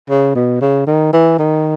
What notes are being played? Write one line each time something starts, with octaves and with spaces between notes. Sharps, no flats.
C#3
B2
C#3
D#3
E3
D#3